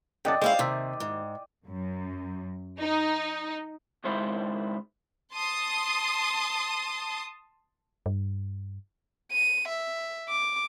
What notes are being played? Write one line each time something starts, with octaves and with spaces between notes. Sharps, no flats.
F#2 C#3 D5 D#5 F#5 G5 A5
G#3 C#4 E4 C5 E5 F5
D#2 C3 C5 E5
G#2
F#2
D#4
C#2 G#2 D#3 G#3 E4 C5
A5 C6 D#6
G2
D#7
E5
D6